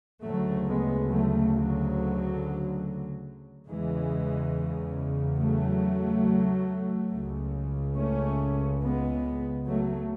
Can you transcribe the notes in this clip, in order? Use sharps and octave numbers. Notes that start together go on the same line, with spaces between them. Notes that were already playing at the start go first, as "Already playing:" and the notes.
D2 C#3 F#3 A3
G#3 B3
F#3 A3
D3 F#3
E2 C#3 E3 G#3
F#3 A3
C#2 C#3
A3 C#4
G#3 B3
F#3 A3